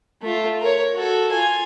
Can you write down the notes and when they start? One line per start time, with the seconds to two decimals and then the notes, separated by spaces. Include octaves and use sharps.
0.22 A3 F4
0.61 A#4 C#5
0.94 F#4 A4
1.31 F4 G#5